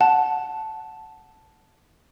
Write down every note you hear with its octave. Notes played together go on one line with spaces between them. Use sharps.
F#5 A5